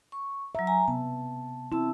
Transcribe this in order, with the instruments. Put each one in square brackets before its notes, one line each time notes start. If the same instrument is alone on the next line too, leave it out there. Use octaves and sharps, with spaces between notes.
[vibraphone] C#6
[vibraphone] F#3 A#5 [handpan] E5
[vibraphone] G#5 A#5
[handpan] C3 B3 [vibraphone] A5
[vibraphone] C4 A5 E6 [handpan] E4